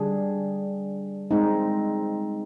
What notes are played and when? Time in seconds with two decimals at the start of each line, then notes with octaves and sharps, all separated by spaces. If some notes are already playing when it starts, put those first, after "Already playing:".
Already playing: D3 G3 D4 G#4
1.31 G#3 C4 D#4